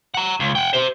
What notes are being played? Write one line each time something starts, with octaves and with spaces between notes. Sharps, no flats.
F#5 A#5
C#2
F#5 G5
G4 C5